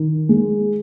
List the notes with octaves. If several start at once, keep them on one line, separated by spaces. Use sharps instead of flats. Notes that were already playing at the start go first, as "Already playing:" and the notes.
Already playing: D#3
G#3